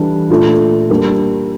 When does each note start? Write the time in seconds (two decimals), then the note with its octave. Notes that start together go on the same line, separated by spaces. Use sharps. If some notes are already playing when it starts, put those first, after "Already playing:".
Already playing: E3 G3 D4 A4
0.30 A#2 A3 D4 F4 A4
0.90 G3 A#3 D4